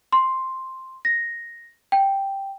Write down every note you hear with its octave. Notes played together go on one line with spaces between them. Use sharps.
C6
A#6
G5